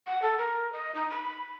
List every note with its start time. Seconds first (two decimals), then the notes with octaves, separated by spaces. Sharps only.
0.07 F#5
0.22 A4
0.38 A#4
0.73 D#5
0.95 D#4
1.10 B5